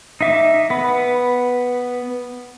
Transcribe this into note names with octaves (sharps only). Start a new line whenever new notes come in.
D#4 E5 D6
B3 B4